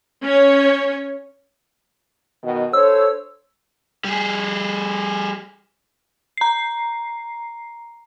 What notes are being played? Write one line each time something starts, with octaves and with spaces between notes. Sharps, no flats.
C#4 C#5
B2 D#3
D4 A4 C5 C#5 E6
G3 G#4
A#5 C7